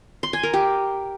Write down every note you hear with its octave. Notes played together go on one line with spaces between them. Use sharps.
C6
G#5
A#4
G4